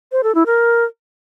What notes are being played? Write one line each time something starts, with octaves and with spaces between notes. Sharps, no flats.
C5
A4
E4
A#4